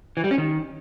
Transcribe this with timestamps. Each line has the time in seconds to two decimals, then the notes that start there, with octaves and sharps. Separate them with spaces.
0.17 E3
0.24 G3
0.31 C#4
0.38 D#3